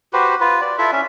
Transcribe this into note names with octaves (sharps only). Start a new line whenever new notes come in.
F#4 G4 B4 C5
F4 B4
D5
E4 F4 A4 E5
C#4 E5